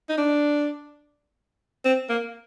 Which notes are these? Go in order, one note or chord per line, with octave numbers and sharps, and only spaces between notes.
D#4
D4
C4
A#3